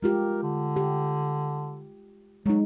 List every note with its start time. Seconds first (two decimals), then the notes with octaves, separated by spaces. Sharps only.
0.02 G#3 F4 G4 A#4
0.43 D3
0.76 G4
2.46 F#3 G#3 D#4